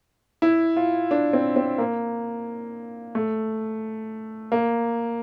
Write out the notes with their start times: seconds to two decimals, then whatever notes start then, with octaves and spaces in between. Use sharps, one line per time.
0.42 E4
0.77 F4
1.11 D4
1.33 C4
1.56 C4
1.78 A#3
3.15 A3
4.52 A#3